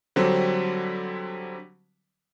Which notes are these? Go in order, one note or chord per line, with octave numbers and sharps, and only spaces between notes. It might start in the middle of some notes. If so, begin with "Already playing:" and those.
D3 F#3 G3 C4